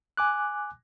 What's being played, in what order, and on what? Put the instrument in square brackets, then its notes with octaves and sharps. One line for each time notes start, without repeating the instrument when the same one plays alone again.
[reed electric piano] G#5 D6 F#6